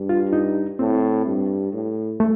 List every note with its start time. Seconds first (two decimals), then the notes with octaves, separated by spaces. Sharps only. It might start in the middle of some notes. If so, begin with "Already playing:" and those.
Already playing: G2
0.09 F4
0.33 D#4
0.79 A2 C4
1.26 G2
1.73 A2
2.20 A3